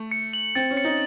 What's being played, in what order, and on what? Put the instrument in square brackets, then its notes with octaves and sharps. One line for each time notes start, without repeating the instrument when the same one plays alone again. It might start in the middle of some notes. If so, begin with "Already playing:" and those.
Already playing: [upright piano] A3
[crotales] C#7
F#7
[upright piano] C4 [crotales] A6
[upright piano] C#4
[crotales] C#7
[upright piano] D#4